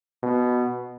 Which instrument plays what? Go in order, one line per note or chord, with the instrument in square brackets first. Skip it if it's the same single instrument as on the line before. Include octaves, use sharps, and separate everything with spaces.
[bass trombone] B2